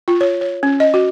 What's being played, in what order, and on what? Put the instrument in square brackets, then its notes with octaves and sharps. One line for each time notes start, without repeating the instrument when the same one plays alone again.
[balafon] F4
C#5
C#5
C#4
D#5
F#4